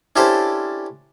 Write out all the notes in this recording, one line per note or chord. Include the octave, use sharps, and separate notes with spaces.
C#4 D4 E4 G4 A4 C5